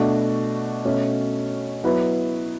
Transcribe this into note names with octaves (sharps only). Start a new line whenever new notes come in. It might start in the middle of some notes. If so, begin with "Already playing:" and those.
Already playing: B2 A3 D4 F#4
B2 A3 C#4
F#3 B3 E4 B4